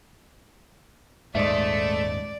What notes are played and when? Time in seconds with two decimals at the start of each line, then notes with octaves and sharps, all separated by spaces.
1.35 D#1 G#2 G#3 A3 D5 E5